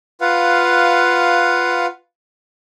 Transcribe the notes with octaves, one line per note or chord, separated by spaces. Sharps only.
F4 B4 F5 F#5